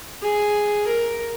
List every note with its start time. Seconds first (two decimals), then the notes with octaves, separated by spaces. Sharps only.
0.22 G#4
0.87 A#4